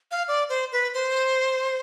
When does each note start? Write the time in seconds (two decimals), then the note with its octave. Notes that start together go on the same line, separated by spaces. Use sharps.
0.11 F5
0.28 D5
0.49 C5
0.72 B4
0.94 C5